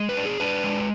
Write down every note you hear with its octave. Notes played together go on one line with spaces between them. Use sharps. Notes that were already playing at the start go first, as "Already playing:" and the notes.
Already playing: G#3
B4
D4
G#4
D4 B4
G#3